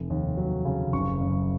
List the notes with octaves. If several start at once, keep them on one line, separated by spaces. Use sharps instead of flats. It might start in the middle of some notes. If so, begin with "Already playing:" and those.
Already playing: F1
D#2
F#3
C#3
F#1 C#6
F#2